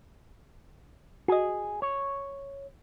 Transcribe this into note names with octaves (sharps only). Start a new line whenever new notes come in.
F#4 G#4 D#5
C#5